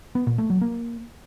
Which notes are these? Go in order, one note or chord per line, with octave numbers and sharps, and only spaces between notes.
B3
A#2
A3
F#3
A#3